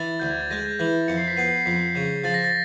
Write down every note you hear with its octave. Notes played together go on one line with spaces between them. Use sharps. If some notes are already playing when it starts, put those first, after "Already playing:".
Already playing: E3 A6
D2 G6
G#6
A6
G#3 A#6
E3
F2 C#7
C7
B6
B3 C7
F2 B6
C#3
F3 A6
A#6
A6